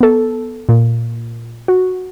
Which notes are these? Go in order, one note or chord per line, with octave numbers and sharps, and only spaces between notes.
B3 A4
A#2
F#4